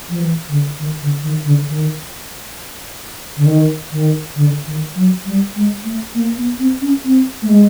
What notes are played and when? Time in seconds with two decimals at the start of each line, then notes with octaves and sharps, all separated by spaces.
0.09 F3
0.20 E3
0.49 D3
0.79 D#3
1.02 D3
1.23 D#3
1.45 D3
1.68 D#3
3.37 D3
3.46 D#3
3.92 D#3
4.36 D3
4.66 D#3
4.96 F#3
5.25 G3
5.56 G#3
5.84 A3
6.15 A#3
6.37 B3
6.59 C4
6.81 C#4
7.05 C4
7.42 A3
7.49 G#3